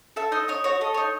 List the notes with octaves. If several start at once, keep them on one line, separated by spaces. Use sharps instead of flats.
A4 E5
D#4 D#5
D#4 C#5
F#4 C#5
A4 D#5
D#4 C#5